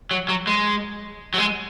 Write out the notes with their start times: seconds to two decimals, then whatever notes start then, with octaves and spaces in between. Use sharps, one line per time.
0.11 F#3
0.29 F#3
0.47 G#3
1.34 F#3
1.38 G#3